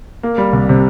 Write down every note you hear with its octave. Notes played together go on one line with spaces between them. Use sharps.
A#3
G3
C2
C3